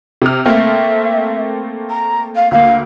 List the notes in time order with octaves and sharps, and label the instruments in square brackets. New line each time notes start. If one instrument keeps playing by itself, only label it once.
[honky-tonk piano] C3 F6
[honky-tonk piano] A3 A#3 C4 [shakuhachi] E5
[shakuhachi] A#5
F5
[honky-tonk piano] D2 A#3 [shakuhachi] F5